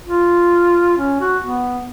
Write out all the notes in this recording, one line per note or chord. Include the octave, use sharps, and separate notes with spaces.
F4
C#4
F#4
B3